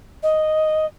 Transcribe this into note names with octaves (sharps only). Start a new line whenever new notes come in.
D#5